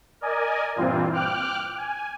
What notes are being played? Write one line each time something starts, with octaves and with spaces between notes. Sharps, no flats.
A#4 D5 D#5 G#5
G2 A#2 E3 C4 F4
G5 D6 F6 F#6
G#5